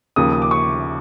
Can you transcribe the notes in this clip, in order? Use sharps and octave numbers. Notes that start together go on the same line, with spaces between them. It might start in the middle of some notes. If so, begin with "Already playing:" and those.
D#2 C#3 F3 D#6
D#6
D6
C#6